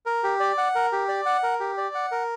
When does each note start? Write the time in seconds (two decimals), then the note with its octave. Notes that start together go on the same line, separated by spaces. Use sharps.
0.06 A#4
0.23 G4
0.40 D5
0.58 F#5
0.75 A#4
0.92 G4
1.08 D5
1.26 F#5
1.43 A#4
1.60 G4
1.78 D5
1.95 F#5
2.12 A#4